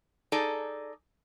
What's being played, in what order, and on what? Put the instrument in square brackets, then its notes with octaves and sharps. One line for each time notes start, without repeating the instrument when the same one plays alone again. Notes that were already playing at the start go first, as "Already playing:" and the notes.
[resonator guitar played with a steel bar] D#4 G#4 A4 D5